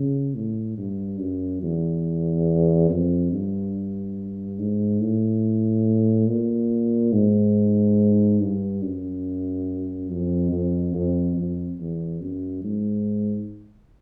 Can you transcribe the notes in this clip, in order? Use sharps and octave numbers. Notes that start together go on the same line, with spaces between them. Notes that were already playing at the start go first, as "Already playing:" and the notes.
Already playing: C#3
A2
G2
F#2
E2
F2
G2
G#2
A2
A#2
G#2
G2
F#2
F2
F2
F2
F2
E2
F#2
G#2